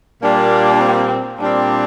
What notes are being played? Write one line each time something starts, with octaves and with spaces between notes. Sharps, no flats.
A#2 G3 A#3 D4
C4
A#2 G3 C4 D4